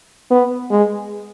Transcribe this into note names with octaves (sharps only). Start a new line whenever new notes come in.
B3
G#3